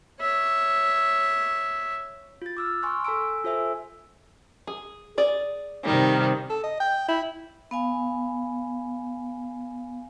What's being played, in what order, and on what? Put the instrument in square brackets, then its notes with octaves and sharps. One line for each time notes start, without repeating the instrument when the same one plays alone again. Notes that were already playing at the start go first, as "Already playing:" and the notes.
[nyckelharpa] C#5 E5
[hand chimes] F4 A6
D6 E6 F6
G#5 C6 C#6 F6 F#6
A4 G#5 A#5 E6 D7
F4 A4 C5 E5 G#5 E6
[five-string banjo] G#4
G#4 D5
[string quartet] C3 D#3 G3
[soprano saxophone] A4
D#5
G5
E4
[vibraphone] B3 F5 G#5